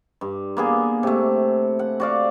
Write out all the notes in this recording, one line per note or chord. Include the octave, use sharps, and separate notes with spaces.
G2
A#3 B3 G#4
C3 A3
F#5
F#4 D5 F5